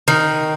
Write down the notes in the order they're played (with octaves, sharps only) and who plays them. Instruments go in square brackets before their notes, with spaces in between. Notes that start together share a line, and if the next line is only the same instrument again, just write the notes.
[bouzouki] D#3